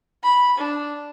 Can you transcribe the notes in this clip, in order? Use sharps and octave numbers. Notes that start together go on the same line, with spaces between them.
B5
D4